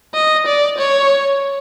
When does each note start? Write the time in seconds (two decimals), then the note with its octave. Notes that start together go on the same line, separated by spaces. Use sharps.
0.14 D#5
0.46 D5
0.78 C#5